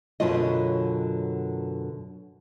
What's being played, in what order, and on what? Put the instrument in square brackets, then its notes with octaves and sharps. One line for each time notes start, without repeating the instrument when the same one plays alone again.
[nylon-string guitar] F#2 B2 D3 F#3 F4 D#5